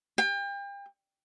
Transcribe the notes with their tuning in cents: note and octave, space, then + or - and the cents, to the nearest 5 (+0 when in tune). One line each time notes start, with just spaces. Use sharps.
G5 +35